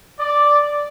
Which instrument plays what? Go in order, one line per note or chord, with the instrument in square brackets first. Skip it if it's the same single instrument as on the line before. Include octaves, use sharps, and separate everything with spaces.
[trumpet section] D5